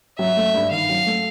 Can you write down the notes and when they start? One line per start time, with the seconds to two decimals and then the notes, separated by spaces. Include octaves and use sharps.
0.18 F#3 E5
0.37 A3
0.54 G2
0.71 D#3 F5
0.89 F#3
1.06 A3